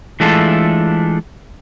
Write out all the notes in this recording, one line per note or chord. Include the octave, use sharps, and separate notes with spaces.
E3 G#3 A3 D4 F4 A4